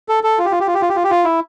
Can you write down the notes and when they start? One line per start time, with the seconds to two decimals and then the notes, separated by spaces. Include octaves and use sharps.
0.09 A4
0.24 A4
0.38 F4
0.45 G4
0.52 F4
0.60 G4
0.67 F4
0.74 G4
0.82 F4
0.89 G4
0.96 F4
1.04 G4
1.11 F4
1.25 E4